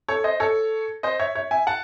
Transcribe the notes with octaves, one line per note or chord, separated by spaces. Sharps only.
A4 C#5
C5 D#5
A4 C#5
C5 D#5
C#5 E5
C#5 E5
E5 G#5
F#5 A5